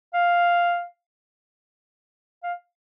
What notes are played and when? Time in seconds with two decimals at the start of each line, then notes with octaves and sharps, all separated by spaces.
0.14 F5
2.43 F5